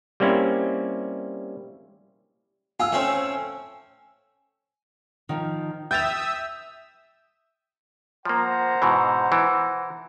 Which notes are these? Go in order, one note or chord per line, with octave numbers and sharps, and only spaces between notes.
G3 A#3 C4 C#4 E4
F4 G#5 E6
A3 C4 C#4
D#3 F3
E5 G5 D#6 E6 G6 A6 F7
F3 A#3 C5 F#5 A#5
G#2 B2 E3
E3